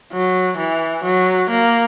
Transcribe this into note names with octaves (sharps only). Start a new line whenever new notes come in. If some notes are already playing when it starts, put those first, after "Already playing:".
F#3
E3
F#3
A#3